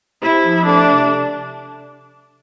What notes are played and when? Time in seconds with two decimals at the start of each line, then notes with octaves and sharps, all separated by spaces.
0.22 C3 E4
0.44 F3
0.66 A3 D4
0.87 C3